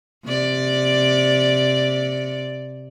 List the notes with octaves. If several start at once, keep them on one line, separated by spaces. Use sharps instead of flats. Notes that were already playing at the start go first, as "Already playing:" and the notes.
C3 D5